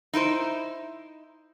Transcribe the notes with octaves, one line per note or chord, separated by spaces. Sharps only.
D#4 E4 B4 C5